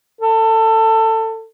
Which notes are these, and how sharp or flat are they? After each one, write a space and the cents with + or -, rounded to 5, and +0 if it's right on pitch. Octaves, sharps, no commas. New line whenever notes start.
A4 +20